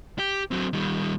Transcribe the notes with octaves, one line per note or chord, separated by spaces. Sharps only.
G4
F#3 C4
D#3 G3